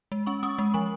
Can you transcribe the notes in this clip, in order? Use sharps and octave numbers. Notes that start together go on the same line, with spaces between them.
G#3
C#4 C#6
C#4 D#6
G#3
F3 C#6